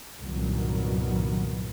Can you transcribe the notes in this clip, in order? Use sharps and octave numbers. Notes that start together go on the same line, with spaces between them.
C2 G2 A#2 D#3 F#3 B3